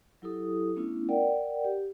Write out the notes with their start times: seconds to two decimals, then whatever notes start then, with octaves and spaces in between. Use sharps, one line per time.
0.22 F#3 E4 G4 A4 D#6
0.76 A3 B3 C#4 D4 E4 F4
1.09 A#4 D5 F#5 G5
1.64 G4